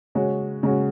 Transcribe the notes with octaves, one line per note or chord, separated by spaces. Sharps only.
C#3 G#3 C#4 F#4
C#3 G#3 C#4 F#4